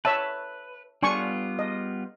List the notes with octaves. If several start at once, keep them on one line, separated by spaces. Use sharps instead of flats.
B4 C#5 E5 A5
G3 B3 D4 F4 G#5 C#6
D#5